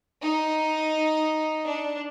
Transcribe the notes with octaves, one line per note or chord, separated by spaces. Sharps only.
D#4
D4